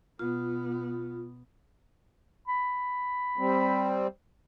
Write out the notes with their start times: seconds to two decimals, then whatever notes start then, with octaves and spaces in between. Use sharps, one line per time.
0.19 B2 B3 F4
2.48 B5
3.38 G3 C4